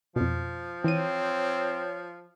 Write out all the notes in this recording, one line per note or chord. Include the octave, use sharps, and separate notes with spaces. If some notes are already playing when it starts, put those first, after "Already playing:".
F2 B2 F3
E3 C4 C#5 D#7